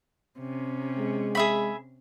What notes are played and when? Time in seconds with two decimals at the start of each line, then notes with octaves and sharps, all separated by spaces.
0.39 C3 C#4
0.98 G#3
1.35 G#4 E5 B5